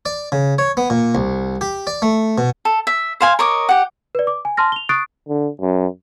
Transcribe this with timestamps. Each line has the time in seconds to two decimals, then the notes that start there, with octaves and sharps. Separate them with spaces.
0.06 D5
0.32 C#3
0.58 C#5
0.77 B3
0.90 A#2
1.15 C2
1.61 G4
1.87 D5
2.02 A3
2.38 B2
2.65 A4
2.87 E5
3.21 C5 F5 G#5
3.39 A#4 C#5 D#5 D6
3.69 G4 F#5
4.15 B4 D5
4.27 D6
4.45 G#5
4.57 A5 C6 F6 A#6
4.72 F7 G7
4.89 C#6 D#6 F#6 A6 C7 D7
5.29 D3
5.61 F#2